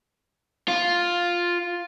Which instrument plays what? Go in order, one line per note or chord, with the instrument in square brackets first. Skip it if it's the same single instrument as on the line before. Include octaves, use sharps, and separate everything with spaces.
[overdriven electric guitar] F4